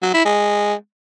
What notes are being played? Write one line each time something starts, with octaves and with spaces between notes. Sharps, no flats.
F#3
E4
G#3